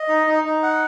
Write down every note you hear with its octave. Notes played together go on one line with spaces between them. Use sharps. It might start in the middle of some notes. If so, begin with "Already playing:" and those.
Already playing: D#5
D#4
D#4
D#4
F#5